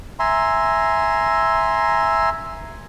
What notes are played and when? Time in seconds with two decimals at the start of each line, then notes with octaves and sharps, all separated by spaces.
0.19 E5 G#5 A#5 C6